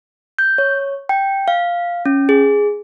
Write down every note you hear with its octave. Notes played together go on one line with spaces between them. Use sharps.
G6
C#5
G5
F5
C#4
G#4